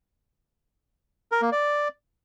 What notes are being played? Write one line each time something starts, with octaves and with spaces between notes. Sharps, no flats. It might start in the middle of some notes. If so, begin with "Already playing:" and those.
A#4
A#3
D5